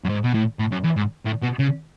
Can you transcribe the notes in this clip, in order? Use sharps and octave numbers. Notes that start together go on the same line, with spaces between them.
F#2
G#2
B2
A2
A2
F#2
E2
G#2
A2
B2
C#3